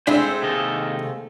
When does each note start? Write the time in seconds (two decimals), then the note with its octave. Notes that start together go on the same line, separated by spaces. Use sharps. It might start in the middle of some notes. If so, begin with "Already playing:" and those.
0.07 G#3 A3 C4 D4 C5 F5 B5
0.42 D#2 C3 D#3 D#5